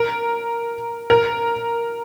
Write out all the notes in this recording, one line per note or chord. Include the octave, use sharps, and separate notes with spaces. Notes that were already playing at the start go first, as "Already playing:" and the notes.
Already playing: A#4
A#4